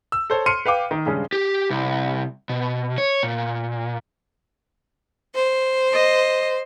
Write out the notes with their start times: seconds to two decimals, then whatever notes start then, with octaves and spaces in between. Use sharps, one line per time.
0.12 E6
0.30 A4 C5 C#5
0.46 C6 F6 C#7 D#7
0.65 B4 F5 G5 D6
0.91 D#3
1.06 G2 C#3 G#3 C#4
1.33 G4
1.70 C2
2.49 B2
2.98 C#5
3.23 A#2
5.34 C5
5.93 D#5